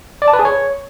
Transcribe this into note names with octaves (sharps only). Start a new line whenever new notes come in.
D5
A5
B4
G#4
C#5